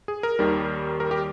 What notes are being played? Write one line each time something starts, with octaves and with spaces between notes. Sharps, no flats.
G#4
A#4
D#2 D#3 G3
A#4
G4